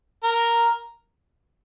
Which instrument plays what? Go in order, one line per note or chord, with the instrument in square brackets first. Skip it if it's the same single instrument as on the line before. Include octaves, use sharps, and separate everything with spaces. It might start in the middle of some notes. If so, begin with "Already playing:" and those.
[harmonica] A#4